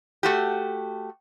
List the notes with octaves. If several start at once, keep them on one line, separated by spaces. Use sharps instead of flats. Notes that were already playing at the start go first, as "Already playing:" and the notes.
A3 F#4 G4